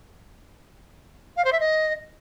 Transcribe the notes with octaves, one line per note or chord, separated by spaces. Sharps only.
F5
C5
E5
D#5